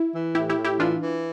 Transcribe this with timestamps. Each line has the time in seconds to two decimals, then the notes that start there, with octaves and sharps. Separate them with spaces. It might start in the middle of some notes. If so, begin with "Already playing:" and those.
Already playing: E4
0.13 E3
0.35 A2 E4 G4
0.50 E4 G4
0.57 A2
0.64 E4 G4
0.79 E3 D4 F4
1.01 E3